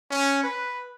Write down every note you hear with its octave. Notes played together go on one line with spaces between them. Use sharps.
C#4
B4